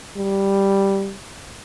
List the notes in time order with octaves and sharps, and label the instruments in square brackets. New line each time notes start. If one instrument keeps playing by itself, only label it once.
[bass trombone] G3